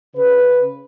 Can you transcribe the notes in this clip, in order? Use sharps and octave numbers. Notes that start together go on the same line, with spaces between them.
C#3 B4